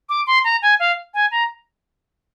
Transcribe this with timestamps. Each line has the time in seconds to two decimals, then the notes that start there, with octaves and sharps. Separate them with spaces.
0.09 D6
0.27 C6
0.44 A#5
0.62 G#5
0.80 F5
1.14 G#5
1.31 A#5